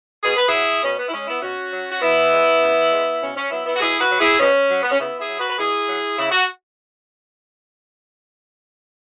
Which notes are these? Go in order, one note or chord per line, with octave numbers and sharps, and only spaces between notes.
B2 G#4
B4
F#3 E4 G#4
B2 C#4
B3
E4
G#3 C#4
B3 E4
B2 C#4 F#4
F#3
F#4
B2 B3 E4
G#3
C#3
G#3
B2 C#4
C#4
F#3 B3 E4
B3 E4
F#4
B2 E4 G#4
F#4 B4
F#3
E4 G#4
B2 C#4
F#3
B3
C#4
C#3 B3 E4
E4 G#4
F#3
F#4 B4
B4
B2 E4 G#4
F#3
C#3 E4
F#4